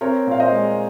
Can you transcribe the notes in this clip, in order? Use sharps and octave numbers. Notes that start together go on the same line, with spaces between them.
C4 A#4 C#5
A#2 F5
C5 D#5
G#3